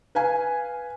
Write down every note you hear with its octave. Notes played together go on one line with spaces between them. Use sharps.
B4 F5 G#5